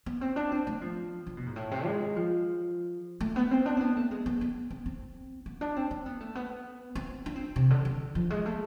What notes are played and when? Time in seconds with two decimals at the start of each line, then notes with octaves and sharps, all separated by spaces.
0.06 B3
0.21 C4
0.36 D4
0.52 C4
0.67 A3
0.81 F3
1.26 D3
1.37 B2
1.46 G#2
1.56 A2
1.71 C3
1.86 G#3
2.16 F3
3.20 A3
3.36 B3
3.51 C4
3.66 D4
3.77 C4
3.81 B3
3.97 A3
4.11 G#3
4.26 B3
4.41 B3
4.71 C4
4.86 C4
5.46 B3
5.61 D4
5.76 C4
5.91 C4
6.06 B3
6.20 A3
6.35 B3
6.95 C4
7.26 D4
7.36 C4
7.56 C3
7.70 D3
7.85 D3
8.15 F3
8.30 G#3
8.46 A3